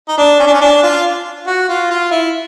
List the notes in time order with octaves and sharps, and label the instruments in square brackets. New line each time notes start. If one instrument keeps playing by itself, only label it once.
[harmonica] D#4
D4
C#4
D4
C#4
D4
F4
F#4
F4
F4
E4